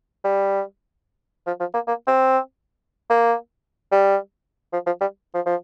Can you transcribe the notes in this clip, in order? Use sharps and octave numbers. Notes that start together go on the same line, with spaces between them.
G3
F3
F3
A#3
A#3
C4
A#3
G3
F3
F3
G3
F3
F3